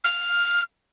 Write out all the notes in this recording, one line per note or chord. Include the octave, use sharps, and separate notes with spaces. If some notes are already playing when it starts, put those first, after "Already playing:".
F6